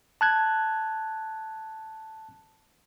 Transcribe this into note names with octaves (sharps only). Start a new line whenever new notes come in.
A5 F#6 G#6